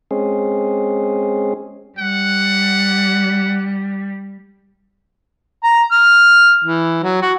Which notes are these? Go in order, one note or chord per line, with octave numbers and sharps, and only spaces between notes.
G#3 C4 C#4 G#4
G3 F#5
A#5
F6
E3
F#3
F#4